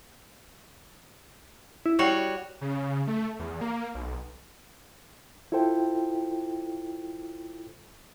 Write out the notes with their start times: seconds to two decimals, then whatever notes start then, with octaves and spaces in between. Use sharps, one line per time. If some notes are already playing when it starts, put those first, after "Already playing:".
1.86 E4
1.99 G3 F#4 C#5
2.61 C#3
3.07 A3
3.39 E2
3.61 A#3
3.94 B1
5.52 E4 F4 A4 C5 G5